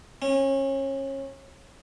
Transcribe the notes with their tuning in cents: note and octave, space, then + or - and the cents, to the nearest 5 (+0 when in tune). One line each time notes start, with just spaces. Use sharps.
C#4 -30